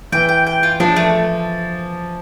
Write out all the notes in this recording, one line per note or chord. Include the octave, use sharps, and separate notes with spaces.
E3 G5
G5
G5
F4
F3 D4
A3